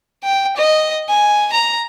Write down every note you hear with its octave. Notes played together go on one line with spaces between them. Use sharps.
G5
D#5
G#5
A#5